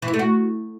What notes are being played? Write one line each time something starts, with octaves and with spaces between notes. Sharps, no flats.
E3
E4
A3
F#4